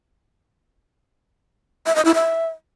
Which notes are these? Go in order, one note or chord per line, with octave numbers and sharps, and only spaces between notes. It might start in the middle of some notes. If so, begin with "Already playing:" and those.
E5
D#5
E4
E5